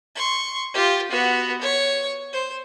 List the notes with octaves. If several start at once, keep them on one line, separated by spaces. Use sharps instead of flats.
C6 C#6
F4 G4
B3 F#4
C#5
C5